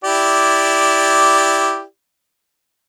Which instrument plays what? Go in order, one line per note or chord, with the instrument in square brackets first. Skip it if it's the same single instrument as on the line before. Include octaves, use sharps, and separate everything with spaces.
[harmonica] E4 G4 D5